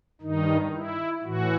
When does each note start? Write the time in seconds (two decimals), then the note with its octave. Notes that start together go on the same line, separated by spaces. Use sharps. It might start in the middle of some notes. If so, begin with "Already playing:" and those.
0.21 G2 D#3 D#4
0.73 E4
1.24 A2 E3 F#4